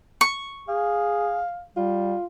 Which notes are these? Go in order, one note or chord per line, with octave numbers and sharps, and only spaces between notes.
C#6
G#4 F5
G3 F4